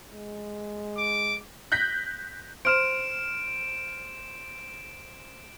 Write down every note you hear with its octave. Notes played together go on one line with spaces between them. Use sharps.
G#3
D6
F#6 G6 A#6 B6
C5 F6 D7 E7